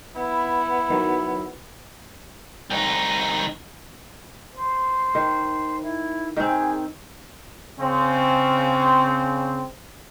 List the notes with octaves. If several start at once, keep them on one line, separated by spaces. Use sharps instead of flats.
B3 E4
D#3 F#3
C2 D#4
C5
D#3
E4
D#3 C4 G#4
C#3 C4